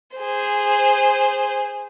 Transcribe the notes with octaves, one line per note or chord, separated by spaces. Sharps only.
G#4 C5